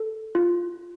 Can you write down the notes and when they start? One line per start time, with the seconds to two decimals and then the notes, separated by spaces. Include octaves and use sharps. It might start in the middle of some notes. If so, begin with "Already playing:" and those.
Already playing: A4
0.35 F4